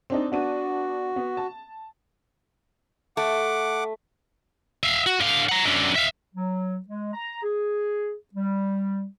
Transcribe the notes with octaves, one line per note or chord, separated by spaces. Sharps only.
C4 D4 D#4
B3 D4 F#4 D#7
B3
A5
A3 F#5 D6
E5 F5
F#4
D3 F5
F#5 A#5
F#2 D3
E5 F5
F#3
G#3
A#5
G#4
G3